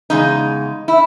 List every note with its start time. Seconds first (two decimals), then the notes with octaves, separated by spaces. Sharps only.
0.10 E2 C#3 G#3 D#4
0.88 E4